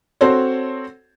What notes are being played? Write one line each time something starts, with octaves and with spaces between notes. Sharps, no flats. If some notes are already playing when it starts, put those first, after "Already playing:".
C4 F#4 A4 C5 C#5